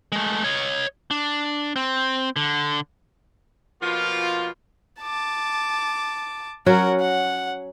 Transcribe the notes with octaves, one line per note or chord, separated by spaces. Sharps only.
G#3 A3
C#5 D#5
D4
C4
D3
B2 F3 A#3 F4
A5 D6
F#3 C#4 F#4 A#4 F#5
F#5